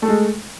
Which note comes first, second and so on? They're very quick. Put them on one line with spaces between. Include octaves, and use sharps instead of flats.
A3 A4 G#3